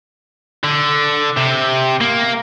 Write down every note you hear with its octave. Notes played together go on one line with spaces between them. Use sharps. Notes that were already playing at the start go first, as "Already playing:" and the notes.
D3
C3
A#3